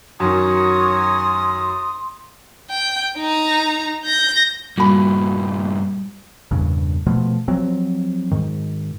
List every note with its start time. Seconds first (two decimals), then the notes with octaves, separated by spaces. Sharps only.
0.20 F#2 D#3 F#3 F#4 C#5 C6 D#6
2.71 G5
3.18 D#4 A#5
4.05 G6 A#6
4.78 G2 A#2 G3 A#3 F#4 B5
6.51 E2 G2 A#2 C#3
7.06 B2 F3 A3
7.48 F3 F#3 C4
8.31 G#2 D#3